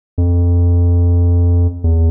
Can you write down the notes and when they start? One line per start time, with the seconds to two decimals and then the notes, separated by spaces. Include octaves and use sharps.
0.18 F2
1.84 E2